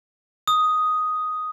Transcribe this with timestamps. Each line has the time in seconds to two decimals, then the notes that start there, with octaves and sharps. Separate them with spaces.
0.48 D#6